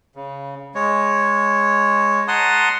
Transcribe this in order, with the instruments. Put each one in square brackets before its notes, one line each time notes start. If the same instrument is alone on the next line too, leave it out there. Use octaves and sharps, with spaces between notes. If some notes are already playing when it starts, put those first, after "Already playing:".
[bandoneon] C#3
G#3 C#5
F#5 A5 A#5 C6 D#6